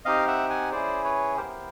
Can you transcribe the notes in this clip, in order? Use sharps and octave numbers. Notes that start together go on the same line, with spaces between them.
C4 D#4 G4 D#5 F5
E5 F#5
F#5 G#5
C#4 E4 G#4 C5 D5
B4 C#5
B3 E4 G4 A#4 C5